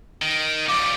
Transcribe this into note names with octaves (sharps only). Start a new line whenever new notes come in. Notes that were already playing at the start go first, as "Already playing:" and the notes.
D#3
F3 G3 D6